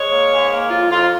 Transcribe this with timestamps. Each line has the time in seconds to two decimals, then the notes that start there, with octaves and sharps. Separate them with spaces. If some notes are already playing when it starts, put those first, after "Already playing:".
Already playing: G#3 C#5
0.12 A#3
0.32 G#2
0.51 A#3
0.71 F2 F4
0.90 F2 F4